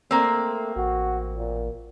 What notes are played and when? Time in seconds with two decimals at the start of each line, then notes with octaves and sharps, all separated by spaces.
0.11 A3 A#3 C4
0.76 A1 F#4
1.36 A#2